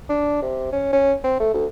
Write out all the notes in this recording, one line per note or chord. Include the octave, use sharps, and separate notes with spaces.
D4
C3
C#4
C#4
C4
A3
D2